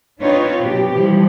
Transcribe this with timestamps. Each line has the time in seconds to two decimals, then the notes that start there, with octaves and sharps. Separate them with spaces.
0.21 C4 D4 D#4 F4 B4 C#5
0.61 B2 F#3 G4
0.95 E3 F3 G3